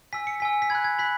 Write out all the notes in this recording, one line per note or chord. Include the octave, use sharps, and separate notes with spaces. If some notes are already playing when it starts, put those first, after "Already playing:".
G#5 E6 B6
C#7
G#5 E6 B6
B6
B5 F#6 G#6
G#6
B5 F#6 B6